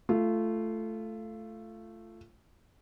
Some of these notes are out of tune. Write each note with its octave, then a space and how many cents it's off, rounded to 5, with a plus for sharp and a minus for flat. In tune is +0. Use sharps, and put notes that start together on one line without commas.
A3 +0 F4 -20